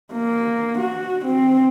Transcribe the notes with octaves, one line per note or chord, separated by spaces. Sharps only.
A#3
F#4
C4